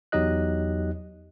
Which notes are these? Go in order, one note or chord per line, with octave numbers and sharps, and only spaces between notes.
E2 F#3 D#4 G4 D#5 F#6